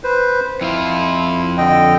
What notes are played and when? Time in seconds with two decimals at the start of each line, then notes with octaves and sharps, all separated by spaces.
0.04 B4 C5
0.61 F2 E4 F4
1.58 D3 D#5 G5